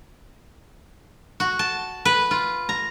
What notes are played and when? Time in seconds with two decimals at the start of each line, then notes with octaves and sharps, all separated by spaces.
1.40 F#4
1.59 A5
2.05 B4
2.31 F4
2.69 A#5